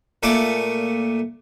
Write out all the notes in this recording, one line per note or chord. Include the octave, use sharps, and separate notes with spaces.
A#2 A3 D5 G#5 D6